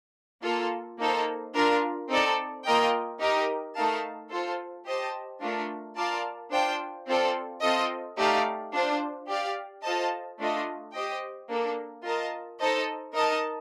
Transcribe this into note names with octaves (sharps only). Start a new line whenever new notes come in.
A#3 F4 A4
A#3 D#4 A4 C5
D4 F4 A#4
C4 D#4 A4 D5
A#3 F4 A#4 D#5 G5
D#4 G4 A#4 D#5
A3 D#4 A#4 F5 A5
F4 A4 C5
G4 C5 D#5 A5
A3 D4 F4 A#4
F4 A#4 D5 F5 A5
D4 F4 C5 G5
C4 F4 A4 D5
C4 F4 A4 D#5
A3 D#4 G4 D5 F5
D4 F4 C5
G4 D5 F5
F4 A4 C5 D#5 A5
A3 D4 F4 A4 D#5
G4 C5 D#5 G5
A#3 D4 A4
F4 A#4 D#5 A5
D#4 A4 C5 D#5 A5
D#4 A#4 D#5 A5